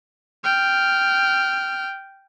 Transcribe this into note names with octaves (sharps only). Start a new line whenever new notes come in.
G5 F6